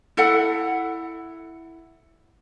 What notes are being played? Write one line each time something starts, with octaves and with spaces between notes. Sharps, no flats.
E4 A4 F#5